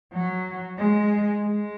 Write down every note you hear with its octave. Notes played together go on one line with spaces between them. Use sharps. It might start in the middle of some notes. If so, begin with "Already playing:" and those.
F#3
G#3
G#3